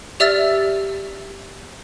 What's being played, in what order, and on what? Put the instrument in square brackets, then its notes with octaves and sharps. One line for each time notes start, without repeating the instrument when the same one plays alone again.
[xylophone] G4 D5 E5 E6 F6 A6